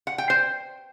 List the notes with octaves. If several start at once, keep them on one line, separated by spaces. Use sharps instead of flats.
F#5
G5
C5